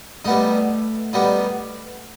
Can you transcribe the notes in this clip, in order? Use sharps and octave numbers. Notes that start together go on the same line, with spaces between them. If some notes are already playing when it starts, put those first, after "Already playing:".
G3 A3 B3 D#4
G3 B3 D#4